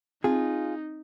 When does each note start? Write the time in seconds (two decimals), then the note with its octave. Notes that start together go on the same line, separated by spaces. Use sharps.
0.24 C4 D#4 F4 G#4